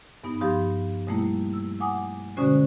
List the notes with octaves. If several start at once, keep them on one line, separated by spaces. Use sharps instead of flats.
G2 B3 D#4
G2 F3 G4 F5 C6 D#6
B2 G3 A3 A#3 E4
E6
F#5 G#5 D6 D#6
B2 D3 G#3 C#4 F#4 C5